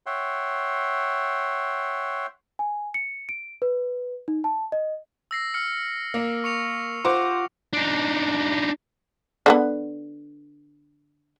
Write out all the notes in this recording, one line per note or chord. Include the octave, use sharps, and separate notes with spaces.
C#5 E5 F#5 G5 C6
G#5
C#7
D7
B4
D#4
A5
D#5
E6 A#6 C7
F6 C#7
A#3
C#6 C#7 F7
F4 C5 F#5 D6
D4 D#4
D3 A#3 B3